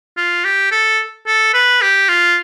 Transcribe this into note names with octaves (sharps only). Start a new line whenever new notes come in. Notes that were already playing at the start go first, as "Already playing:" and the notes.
F4
G4
A4
A4
B4
G4
F4